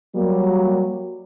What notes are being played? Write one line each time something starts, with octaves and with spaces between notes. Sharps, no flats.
F#3 G3 A#3